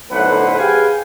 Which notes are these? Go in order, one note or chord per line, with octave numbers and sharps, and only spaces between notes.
B1 A2 D3 B4 C5 F#5
G4 G#4 B4 F5 G5 G#5